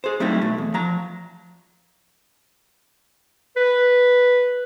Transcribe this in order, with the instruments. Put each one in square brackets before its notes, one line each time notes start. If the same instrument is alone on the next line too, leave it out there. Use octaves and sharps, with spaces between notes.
[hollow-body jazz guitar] G#4 C5
F#3 G3 A3 C4 D#4 E4
B2 A3
E2
F3 A#5
[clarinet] B4